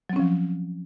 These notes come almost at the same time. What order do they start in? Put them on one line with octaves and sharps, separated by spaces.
F#3 C4 C#4 F3